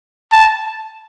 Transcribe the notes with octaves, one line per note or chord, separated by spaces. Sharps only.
A5